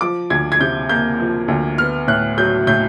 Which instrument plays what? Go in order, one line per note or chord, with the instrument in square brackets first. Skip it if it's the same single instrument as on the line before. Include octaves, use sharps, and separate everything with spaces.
[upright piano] F3 D6
D2 G#6
G#6
C3 G6
A#3 G6
F3
D2
B3 F6
A2 F#6
F#3 G6
A2 G6